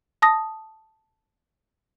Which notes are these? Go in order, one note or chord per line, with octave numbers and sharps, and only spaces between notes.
A5 D#6 A#6